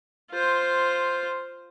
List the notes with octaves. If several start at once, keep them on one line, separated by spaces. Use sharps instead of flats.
F4 C5